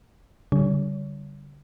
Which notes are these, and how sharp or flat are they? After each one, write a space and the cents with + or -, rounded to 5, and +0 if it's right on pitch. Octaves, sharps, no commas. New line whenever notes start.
D3 -45 G3 -20 C#5 +35